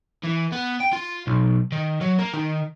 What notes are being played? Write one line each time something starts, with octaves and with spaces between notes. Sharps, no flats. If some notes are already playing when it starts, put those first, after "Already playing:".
E3
B3
G5
F4
B1
D#3
F#3
A#3
D#3